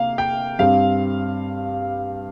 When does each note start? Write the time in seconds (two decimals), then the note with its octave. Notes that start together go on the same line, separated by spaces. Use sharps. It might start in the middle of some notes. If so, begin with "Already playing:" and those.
Already playing: C3 A#3 F5
0.18 G5
0.59 G2 G3 C4 F5